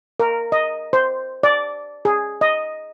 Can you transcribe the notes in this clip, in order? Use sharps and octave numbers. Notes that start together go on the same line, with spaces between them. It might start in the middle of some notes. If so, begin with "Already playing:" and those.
A#4
D#5
C5
D5
G#4
D#5